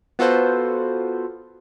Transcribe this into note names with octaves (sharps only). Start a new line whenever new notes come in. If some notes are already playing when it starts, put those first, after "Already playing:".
B3 F4 F#4 A4 B4 C5